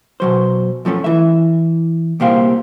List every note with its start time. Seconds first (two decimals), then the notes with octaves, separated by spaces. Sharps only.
0.20 B2 F#3 C5
0.85 F#2 F3 A3 C#4
1.04 E3 E5
2.20 C2 A#2 A#3 G4 C5 F5